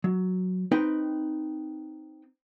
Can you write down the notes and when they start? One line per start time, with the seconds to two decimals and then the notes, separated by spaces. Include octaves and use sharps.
0.04 F#3
0.72 C4 D#4 B4 G5